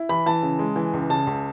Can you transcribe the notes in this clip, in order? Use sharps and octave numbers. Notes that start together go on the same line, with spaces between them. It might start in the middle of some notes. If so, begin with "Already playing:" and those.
Already playing: E4
E3 B5
E3 A5
C#3
G#3
E3
C#2
C#3 A5
C#2